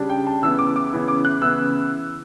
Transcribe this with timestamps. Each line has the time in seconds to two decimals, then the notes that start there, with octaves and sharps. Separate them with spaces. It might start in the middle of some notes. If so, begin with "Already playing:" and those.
Already playing: C#3 G3 D4
0.09 G5
0.26 A5
0.42 C#3 E3 B3 E6
0.59 D6
0.76 D6
0.93 C#3 E3 B3
1.08 D6
1.25 F#6
1.41 C#3 E3 B3 E6